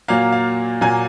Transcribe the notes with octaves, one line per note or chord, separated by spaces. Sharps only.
A#2 F#3 A#3 F5
F5
A#2 F#3 A#3 G#5